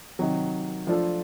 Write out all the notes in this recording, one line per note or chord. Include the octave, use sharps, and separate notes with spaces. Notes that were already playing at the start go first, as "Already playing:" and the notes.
C3 D#3 F#3
F3 A3 D4 F4 A4